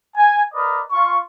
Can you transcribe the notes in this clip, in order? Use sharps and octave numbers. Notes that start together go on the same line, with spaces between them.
G#5
A#4 B4 D5 D#5
F4 C#6